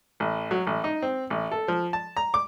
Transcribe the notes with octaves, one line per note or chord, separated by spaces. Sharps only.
A1
F#3
A1
D#4
C4
A1
A4
F3
A5
A#5
D6